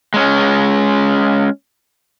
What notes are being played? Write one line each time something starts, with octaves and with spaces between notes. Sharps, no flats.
G#3 C#4